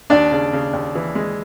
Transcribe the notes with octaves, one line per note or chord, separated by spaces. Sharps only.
D#2 D4 D5
C#3
C#3
D#2
E3
G#3